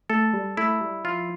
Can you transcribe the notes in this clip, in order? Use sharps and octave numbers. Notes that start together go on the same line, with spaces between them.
A3 A4
G3
A3 E4
G3
F3 F4